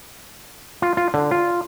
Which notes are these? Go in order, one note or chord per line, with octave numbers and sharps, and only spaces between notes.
F4
F4
D3
F4